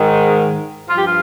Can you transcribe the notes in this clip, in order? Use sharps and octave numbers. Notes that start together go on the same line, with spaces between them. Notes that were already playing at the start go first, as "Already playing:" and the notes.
Already playing: G#2 D#3
G2 F3 F4
G4
F4